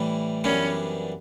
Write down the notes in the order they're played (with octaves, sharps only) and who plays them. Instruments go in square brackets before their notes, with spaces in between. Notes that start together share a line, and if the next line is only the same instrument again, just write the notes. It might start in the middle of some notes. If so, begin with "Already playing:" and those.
Already playing: [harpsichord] A2 E3 G3
[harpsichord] F#2 E3 G3 B3 D4 [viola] C#4